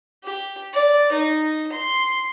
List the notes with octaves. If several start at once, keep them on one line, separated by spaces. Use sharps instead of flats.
G4
D5
D#4
C6